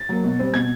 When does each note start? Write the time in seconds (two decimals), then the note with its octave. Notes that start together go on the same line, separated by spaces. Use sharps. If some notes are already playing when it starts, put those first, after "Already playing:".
Already playing: A6
0.09 F#3 A#3
0.24 B2
0.39 G3 C4
0.54 B2 G#6